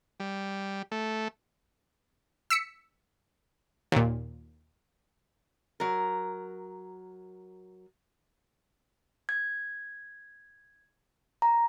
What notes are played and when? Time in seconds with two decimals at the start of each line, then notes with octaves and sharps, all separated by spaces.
0.20 G3
0.92 A3
2.50 E6 B6 C#7
3.92 D#2 A#2
5.80 F#3 A#4
9.29 G#6
11.42 A#5